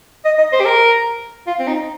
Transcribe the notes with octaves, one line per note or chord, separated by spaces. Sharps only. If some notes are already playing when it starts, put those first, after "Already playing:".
D#5
D#5
C5
G4
A#4
F4
C4
D#4